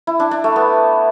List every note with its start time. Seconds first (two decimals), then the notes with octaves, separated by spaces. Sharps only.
0.07 E4
0.20 D4
0.31 D4
0.44 A3
0.56 B3